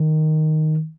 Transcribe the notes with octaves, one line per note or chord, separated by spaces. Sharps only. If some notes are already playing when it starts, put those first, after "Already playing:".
Already playing: D#3